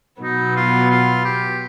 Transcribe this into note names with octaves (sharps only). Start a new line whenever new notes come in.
B2 F#3 B3 D#4
F4
F4
G4